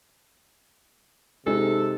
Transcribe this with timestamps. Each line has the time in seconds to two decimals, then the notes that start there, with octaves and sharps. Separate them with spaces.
1.46 C3 G#3 D#4 A4